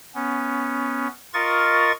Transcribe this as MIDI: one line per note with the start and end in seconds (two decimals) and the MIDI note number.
0.15 1.07 59
0.15 1.07 61
1.34 1.92 65
1.34 1.92 70
1.34 1.92 75
1.34 1.92 85
1.34 1.92 93